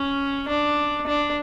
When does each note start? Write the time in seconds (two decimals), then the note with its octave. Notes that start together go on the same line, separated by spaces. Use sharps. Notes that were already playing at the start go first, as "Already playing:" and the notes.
Already playing: C#4
0.48 D4
1.06 D4